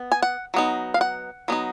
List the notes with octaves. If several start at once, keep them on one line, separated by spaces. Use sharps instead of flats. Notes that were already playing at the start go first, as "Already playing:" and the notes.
Already playing: B3
G#5
F#5
F#3 B3 D#4
F5
F#5
F#3 B3 D#4